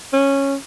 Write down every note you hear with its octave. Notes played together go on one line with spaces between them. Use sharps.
C#4